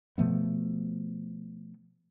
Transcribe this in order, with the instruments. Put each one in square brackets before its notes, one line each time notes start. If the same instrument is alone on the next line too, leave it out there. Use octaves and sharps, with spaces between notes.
[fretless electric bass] B2 F3 A3 B3